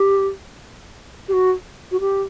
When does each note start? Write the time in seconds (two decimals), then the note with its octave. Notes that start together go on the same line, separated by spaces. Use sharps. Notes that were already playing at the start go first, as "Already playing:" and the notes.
Already playing: G4
1.28 G4
1.33 F#4
1.92 F#4
2.00 G4